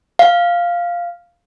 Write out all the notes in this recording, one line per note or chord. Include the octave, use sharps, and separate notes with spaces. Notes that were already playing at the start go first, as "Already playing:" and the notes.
F5